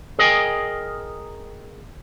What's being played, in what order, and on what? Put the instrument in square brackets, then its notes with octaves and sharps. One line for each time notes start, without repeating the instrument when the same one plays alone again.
[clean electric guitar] G#4 A#4 D#5 G5 G#5